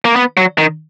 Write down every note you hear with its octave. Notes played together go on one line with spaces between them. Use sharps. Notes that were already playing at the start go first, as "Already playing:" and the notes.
A#3
B3
F#3
D#3